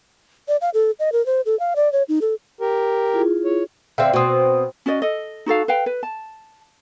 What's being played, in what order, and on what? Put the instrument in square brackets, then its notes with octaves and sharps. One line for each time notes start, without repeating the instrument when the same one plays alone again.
[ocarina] D5
F5
A4
D#5
A#4
C5
A4
F5
D5
C#5
D#4
A4
[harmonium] G4 A#4
[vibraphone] E4 F4 G#4
[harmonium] C#5
[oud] D3 C4 [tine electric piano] E5 F5 G5
[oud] B2 C4 [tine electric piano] F#4 D#6
[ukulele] C#4 F#4 D5 D#5
A4 D#5
D#4 F#4 A4 F5
B4 F5 G5
B4
A5